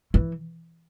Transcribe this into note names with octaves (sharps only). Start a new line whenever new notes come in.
E3